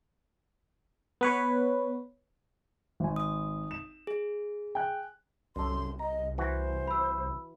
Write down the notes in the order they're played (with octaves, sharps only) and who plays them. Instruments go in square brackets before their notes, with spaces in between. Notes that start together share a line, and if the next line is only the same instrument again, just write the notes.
[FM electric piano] B3 B4 C#5
[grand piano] G#1 G#5
[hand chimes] D#6
[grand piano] E7
[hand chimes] G#4
[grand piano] G5 G#5 F#6
[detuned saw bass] C2 [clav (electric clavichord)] F#2 A4 [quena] C6
[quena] D#5 [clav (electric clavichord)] A#5
[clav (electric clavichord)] E3 F#4 [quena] C5
[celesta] B5 E6